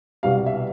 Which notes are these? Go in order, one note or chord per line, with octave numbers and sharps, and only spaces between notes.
C2 B2 G3 B3 F5
E5